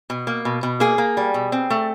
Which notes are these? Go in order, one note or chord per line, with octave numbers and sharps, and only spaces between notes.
B2
A#3
B2
B2
A#3 G#4
A#3
G3
B2
C4
A3